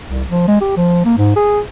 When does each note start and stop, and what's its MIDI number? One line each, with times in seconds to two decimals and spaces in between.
0.09 0.24 36
0.29 0.47 53
0.48 0.57 56
0.61 0.73 67
0.77 1.04 53
1.05 1.14 58
1.17 1.34 44
1.36 1.60 68